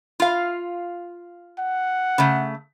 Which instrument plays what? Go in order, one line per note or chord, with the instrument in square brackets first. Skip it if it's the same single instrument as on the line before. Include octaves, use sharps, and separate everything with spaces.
[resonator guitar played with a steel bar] F4 F5
[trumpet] F#5
[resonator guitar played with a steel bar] C#3 A3